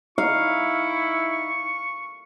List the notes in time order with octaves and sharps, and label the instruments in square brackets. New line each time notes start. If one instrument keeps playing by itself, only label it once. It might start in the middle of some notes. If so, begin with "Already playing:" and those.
[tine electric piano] D#4 [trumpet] E4 [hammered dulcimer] F5 [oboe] C#6